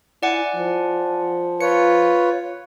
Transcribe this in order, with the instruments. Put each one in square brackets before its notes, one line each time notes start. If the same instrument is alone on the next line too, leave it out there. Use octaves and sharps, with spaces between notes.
[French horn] E4 [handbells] D5 F#5 G#5
[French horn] F3
[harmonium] F4 B4 C#5 [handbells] C#7